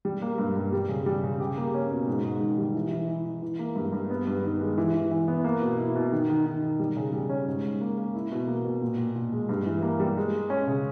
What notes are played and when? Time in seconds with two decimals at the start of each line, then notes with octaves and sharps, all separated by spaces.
0.05 G3
0.22 A#3
0.38 G2
0.56 G2
0.72 G3
0.89 C#3
1.06 G3
1.24 C#3
1.40 G4
1.57 A#3
1.74 C#4
1.91 B2
2.07 G#2
2.24 G#2
2.41 D#3
2.58 G3
2.75 E3
2.92 E3
3.08 E4
3.25 E3
3.42 E3
3.59 A#3
3.75 G2
3.92 G2
4.10 B3
4.27 G2
4.44 D#3
4.61 G#3
4.78 E3
4.94 E3
5.11 E3
5.28 B3
5.44 A#3
5.62 B2
5.78 E4
5.95 B2
6.12 D#3
6.30 D#3
6.46 D#3
6.62 D#3
6.79 G3
6.97 C#3
7.13 G3
7.30 C#4
7.47 G#2
7.64 G#2
7.81 A#3
7.98 A#3
8.15 E4
8.32 B2
8.47 A#3
8.65 B2
8.82 A#2
8.98 A#2
9.16 A#2
9.32 G#3
9.49 G2
9.66 E3
9.83 A#3
10.00 G3
10.17 G#3
10.33 G#3
10.50 C#4
10.68 C#3